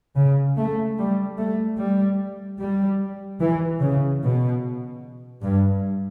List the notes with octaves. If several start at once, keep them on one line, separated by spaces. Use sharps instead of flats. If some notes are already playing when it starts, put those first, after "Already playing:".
C#3
A3
G3
A3
G3
G3
E3
C#3
B2
G2